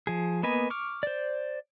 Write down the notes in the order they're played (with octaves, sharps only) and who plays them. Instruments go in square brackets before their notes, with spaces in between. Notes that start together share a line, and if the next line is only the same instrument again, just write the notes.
[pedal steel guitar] F3 G#4
A#3 B3 B4 D#5 G#5
C#6 D6 F6
C5 D5